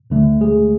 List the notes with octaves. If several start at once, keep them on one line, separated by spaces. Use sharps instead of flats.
D2 D3 A3
G#3 G#4